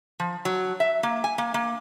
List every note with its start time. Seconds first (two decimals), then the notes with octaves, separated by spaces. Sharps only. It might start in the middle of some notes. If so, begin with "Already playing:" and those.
0.20 F3
0.45 F#3
0.80 E5
1.03 A#3
1.24 G#5
1.38 A#3
1.54 A#3